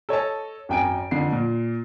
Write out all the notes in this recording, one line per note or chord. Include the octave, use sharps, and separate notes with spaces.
A4 C#5 D#5 A5
G#1 F#2 G5 G#5 D7
F2 D3 D#3 C7
A#2